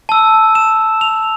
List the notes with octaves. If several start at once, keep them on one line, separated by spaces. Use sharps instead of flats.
A5 E6
E7
F7